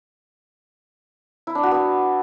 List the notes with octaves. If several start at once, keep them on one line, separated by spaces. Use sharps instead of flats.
E4
D4
F#4
B3